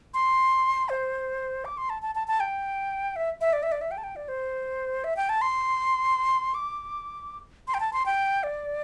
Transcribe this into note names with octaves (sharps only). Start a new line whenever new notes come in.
C6
C5
D6
C6
A5
A5
A5
A5
G5
E5
E5
D5
E5
D5
E5
G5
A5
G5
D5
C5
E5
G5
A5
C6
D6
C6
G5
A5
C6
G5
D5